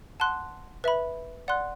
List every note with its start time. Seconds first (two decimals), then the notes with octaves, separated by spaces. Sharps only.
0.20 F#5 A5 C6 F#6
0.84 B4 E5 B5
1.48 D5 F#5 C6 F#6